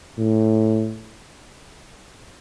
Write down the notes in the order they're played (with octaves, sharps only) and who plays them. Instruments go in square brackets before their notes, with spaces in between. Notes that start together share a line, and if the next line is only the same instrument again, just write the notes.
[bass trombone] A2